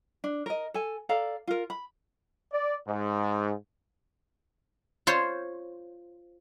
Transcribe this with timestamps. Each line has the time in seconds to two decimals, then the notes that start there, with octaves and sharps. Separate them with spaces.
0.24 D4
0.46 A#4 D#5
0.74 A4 G#5
1.09 A4 D5 F5 A#5
1.48 F4 A#4
1.70 B5
2.53 D5
2.88 G#2
5.07 F4 C5 C#5